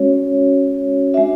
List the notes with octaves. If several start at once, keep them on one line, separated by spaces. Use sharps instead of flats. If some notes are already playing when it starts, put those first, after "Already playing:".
Already playing: G#3 C#4 F#4 C#5
G#3 D4 F#4 E5